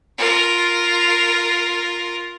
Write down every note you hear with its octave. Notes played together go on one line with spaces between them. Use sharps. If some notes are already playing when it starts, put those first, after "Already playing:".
F4 A#4